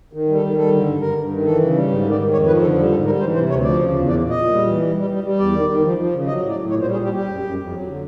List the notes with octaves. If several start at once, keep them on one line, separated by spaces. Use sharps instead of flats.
D#3
G3
A4
D#3
G3 A4
D3
G2
G2 A#4
G2
D#3
E3 A4
C#3
G3
G#2
D#3
D5
D#3
F2 C#5
F3 B4
D3 A4
G3 A4
G#2 A4
G3 A#4
E3 C5
C3 C5
D2 C#5
F3 D5
C#3
E2
A#2 D5
A#2
D#5
A#2
G3
E3
G3
G3
G3
G3
E2 D5
D#3
D#3
F3
F3
C#3
F#3 D#5
A2
D5
A2
A#2 C#5
C5
G3
G#4
G3 G4
G3 G4
F#2
F#2
F2
F#3
D3